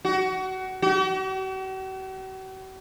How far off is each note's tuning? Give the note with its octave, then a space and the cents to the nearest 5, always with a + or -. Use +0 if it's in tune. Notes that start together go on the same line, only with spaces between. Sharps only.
F#4 +25
F#4 +45